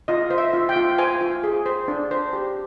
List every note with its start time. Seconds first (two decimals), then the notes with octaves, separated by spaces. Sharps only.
0.08 F4 D#5
0.30 C5
0.38 E5
0.53 F4
0.69 G5
0.76 F4
0.99 C5 G#5
1.21 F4
1.44 G#4
1.66 C5
1.88 D4
2.11 C5
2.33 G4